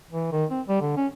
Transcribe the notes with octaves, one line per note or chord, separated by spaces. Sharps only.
E3
D#3
C4
G3
D3
C#4